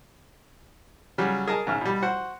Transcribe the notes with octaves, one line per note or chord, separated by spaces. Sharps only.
C#3 F#3 G3
G#4 A#4 D#5 A5
G#2 C#3 E5 F6
B2 G3
F#4 C5 F#5